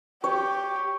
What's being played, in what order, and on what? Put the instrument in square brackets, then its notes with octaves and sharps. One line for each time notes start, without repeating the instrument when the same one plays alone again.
[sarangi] G4 [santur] C#5